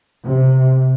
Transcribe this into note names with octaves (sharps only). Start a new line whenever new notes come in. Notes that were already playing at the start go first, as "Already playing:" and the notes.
C3